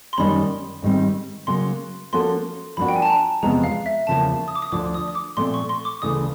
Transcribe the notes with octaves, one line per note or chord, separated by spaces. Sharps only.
C6
F#2 D#3 G3 A#3 C#4 B5
G#2 D#3 G3 C4
C#3 F#3 A#3 C6
F3 A#3 C#4 F#4 A4 C6
F3 A#3 D4 F#4 B5
G5
G#5
A5
A#5
E2 C3 F3 G#3 B3 A#5
F5
E5
E2 C#3 F3 A#3 A5
D#6
D6
D#6
D2 D3 F3 D6
D#6
D#6
D6
A#2 F3 A3 C4 C6
C#6
C6
D6
D2 C#3 E3 A3 D#6